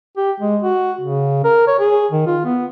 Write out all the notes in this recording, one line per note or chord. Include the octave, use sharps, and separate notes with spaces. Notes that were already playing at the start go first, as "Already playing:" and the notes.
G4
G#3
F#4
C#3
A#4
C#5
G#4
D#3
F4
B3